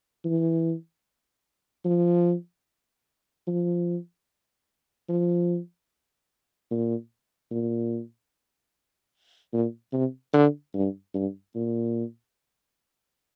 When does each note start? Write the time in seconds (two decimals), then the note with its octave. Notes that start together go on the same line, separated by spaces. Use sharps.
0.25 E3
1.85 F3
3.47 F3
5.09 F3
6.71 A#2
7.51 A#2
9.53 A#2
9.93 C3
10.34 D3
10.74 G2
11.14 G2
11.55 A#2